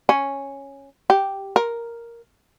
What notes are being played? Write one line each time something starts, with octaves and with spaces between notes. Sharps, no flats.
C#4
G4
A#4